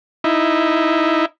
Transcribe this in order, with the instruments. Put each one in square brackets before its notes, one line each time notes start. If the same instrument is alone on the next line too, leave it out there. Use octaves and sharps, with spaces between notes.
[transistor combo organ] D#4 E4